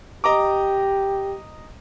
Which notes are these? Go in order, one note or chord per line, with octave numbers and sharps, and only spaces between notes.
G4 D#5 A#5 D6